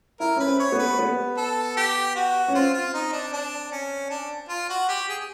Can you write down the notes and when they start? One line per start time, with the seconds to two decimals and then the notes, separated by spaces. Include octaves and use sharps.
0.20 E4 A#4
0.36 C#4 B4
0.46 C4
0.60 C#5
0.72 B3
0.79 B4
0.99 B3
1.37 A4
1.77 G4
2.16 F#4
2.48 C#4
2.55 C4 F4
2.74 F4
2.94 D#4
3.13 D4
3.33 D4
3.72 C#4
4.10 D4
4.49 F4
4.70 F#4
4.89 G4
5.09 G#4